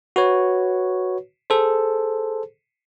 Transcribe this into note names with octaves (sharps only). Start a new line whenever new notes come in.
F#4 B4 C#5
G#4 A4 C5